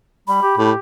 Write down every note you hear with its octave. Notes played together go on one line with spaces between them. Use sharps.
G3 B5
G4
A2 G4